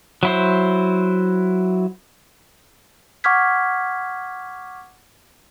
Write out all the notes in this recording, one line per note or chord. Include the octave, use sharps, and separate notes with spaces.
F#3 E4 C5
F#5 C#6 D6 F6 G#6 B6